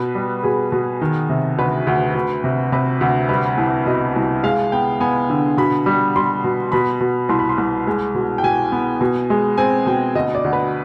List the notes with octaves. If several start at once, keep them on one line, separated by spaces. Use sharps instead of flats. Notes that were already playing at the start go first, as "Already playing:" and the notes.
Already playing: B2 B4
G3
B2 G#4
B2
D#3
C3
D2 B4
D2
D2
C3
C3 B4
D2
G3 B4
C2
B2 D#5
C2
G#3 F5
B3 G5
B3 G#5
D3
B2 B5
G3
G3 C6
B2
B2 B5
B2
C2 C6
B5
C6
C2
G#3
B2
G5
B2 G#5
B3
B2
G#3
C4 G#5
B2 G5
D2 D#5
D5
D2
B4